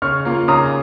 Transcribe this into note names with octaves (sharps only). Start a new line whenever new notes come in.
C#3 C#6 F6
A#3 F4
C#3 A#5 D#6